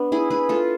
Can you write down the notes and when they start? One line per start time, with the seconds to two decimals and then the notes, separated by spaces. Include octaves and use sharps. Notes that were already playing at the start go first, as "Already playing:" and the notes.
Already playing: B3 D4
0.12 E4 G#4
0.30 G#4 B4
0.49 F4 A4